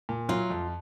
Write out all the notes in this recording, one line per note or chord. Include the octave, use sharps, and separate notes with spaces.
A#2
F#3 F4
F2